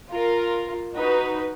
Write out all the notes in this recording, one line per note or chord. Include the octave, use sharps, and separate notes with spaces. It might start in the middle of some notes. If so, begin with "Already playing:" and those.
F4 A#4
D#4 F#4 B4